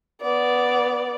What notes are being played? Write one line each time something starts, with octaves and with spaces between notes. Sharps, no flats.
B3 D5